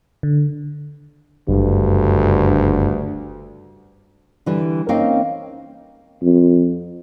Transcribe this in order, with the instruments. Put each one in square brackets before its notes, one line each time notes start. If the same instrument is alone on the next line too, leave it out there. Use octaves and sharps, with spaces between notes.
[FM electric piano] D3
[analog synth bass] F#1 [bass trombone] D2 [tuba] G2
[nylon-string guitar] D3 E3 G3
A#3 C4 C#4 D#4 F5 G5
[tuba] F2